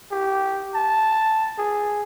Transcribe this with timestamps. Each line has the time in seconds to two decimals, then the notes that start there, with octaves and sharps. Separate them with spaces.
0.11 G4
0.74 A5
1.58 G#4